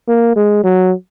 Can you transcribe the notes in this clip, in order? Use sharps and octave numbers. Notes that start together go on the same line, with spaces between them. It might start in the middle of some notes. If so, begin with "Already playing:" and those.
A#3
G#3
F#3